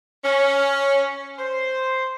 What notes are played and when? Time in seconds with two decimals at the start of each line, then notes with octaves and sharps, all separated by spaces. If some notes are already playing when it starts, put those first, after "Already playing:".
0.24 C#4
1.37 C5